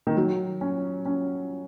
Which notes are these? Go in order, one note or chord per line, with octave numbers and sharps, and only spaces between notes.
D#3
F#3
C#4
C#4